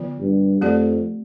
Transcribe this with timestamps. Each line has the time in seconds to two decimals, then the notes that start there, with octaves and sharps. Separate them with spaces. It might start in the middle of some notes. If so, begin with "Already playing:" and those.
Already playing: D3 F3 B3 F4
0.20 G2
0.61 F2 A3 C4 G4 D5